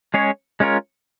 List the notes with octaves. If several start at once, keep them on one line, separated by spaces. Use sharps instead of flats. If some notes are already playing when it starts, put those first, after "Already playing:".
G#3 C#4 G#4 C#5
G#3 C#4 F4 A#4 C#5